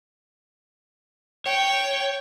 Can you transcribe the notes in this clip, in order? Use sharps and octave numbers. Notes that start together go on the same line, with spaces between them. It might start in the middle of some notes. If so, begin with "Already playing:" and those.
C#5 G5